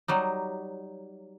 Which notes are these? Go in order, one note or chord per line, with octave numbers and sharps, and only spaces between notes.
F#3 G3 D#4